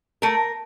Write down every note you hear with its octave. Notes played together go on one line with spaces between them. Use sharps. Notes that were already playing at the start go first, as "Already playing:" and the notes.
A3 A#4